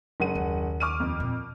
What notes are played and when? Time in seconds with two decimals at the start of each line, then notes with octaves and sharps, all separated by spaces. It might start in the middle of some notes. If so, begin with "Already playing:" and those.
0.20 F#1 F#5 D#7
0.35 D#2
0.80 D6 F6 D#7
1.00 F2
1.20 A#2